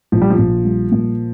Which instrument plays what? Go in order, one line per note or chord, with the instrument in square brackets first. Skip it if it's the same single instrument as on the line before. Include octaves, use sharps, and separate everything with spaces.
[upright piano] A#1 [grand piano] F3
[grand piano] G3
F3
[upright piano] A#1
G3
A#2